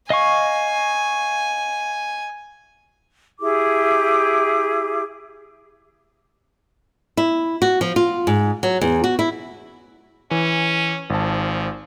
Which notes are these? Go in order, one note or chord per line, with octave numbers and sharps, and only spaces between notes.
D#5 F5 G#5 C#6
E4 G4 G#4 D6
E4
F#4
F3
F4
G#2
F#3
E2
F#4
E4
E3 C#4
G#1 F3 A5